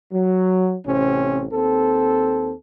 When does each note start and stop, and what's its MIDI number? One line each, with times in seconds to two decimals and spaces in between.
0.13 0.75 54
0.86 1.46 33
0.86 1.46 48
0.86 1.46 60
0.86 1.46 61
1.52 2.53 39
1.52 2.53 60
1.52 2.53 69